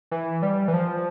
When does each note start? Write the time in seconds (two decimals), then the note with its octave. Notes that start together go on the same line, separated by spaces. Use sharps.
0.11 E3
0.43 G3
0.68 E3
0.74 F3